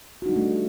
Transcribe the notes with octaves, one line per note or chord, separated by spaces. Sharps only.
G3 A3 D4 D#4 F#4